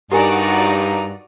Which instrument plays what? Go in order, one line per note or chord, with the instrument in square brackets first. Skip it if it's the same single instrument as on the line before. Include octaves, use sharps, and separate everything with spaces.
[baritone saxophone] G2 [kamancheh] D#4 A#5 [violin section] F#4 D5 [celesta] G4 A#4 G#5